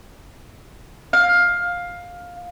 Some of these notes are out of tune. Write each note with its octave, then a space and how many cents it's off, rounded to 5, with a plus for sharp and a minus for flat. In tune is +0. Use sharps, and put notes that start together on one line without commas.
F5 +15